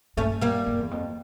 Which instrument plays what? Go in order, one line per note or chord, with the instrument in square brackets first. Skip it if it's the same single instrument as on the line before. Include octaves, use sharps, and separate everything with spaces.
[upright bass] G2 [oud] A3 C#4
[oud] G3 A#3
[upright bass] G2
E2
F2